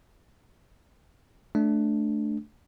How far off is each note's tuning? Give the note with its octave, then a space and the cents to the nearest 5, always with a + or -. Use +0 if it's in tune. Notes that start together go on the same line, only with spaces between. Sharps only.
A3 -15 D4 +0